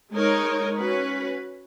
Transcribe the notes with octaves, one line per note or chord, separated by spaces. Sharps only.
G#3 D#4 A#4 C#5
C#4 F#4 B4